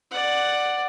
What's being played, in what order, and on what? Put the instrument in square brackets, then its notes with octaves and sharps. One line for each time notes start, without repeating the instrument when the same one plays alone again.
[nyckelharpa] D5 F#5